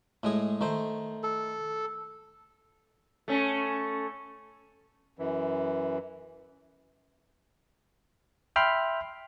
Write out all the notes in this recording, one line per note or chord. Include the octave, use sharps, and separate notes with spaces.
A2 G#3 G#4
D#3 A3 C5
A4
A3 C#4
F#2 E3
E5 G5 B5 C6 F6